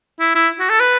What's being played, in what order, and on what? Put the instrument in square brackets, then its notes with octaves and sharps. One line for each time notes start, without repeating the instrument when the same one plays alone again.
[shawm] E4
E4
F#4
A4
B4